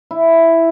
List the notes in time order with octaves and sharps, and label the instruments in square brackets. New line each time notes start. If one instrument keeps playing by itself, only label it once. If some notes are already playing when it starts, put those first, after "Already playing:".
[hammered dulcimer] E4